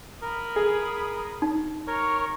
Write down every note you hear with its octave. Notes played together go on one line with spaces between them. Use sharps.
A#4 B5 D#6
G#4
D#4
A#4 C#5 C#6